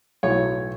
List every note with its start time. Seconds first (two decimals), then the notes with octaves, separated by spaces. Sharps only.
0.23 B1 A2 F#3 C#5